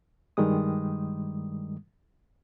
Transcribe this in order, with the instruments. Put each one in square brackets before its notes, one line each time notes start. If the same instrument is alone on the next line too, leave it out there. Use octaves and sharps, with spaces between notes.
[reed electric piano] G2 D#3 G3 G#3 D#6